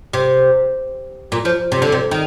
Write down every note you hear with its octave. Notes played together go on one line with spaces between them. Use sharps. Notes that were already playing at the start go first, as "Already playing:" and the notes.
C3
A#2
F3
C3
D3
C3
D#3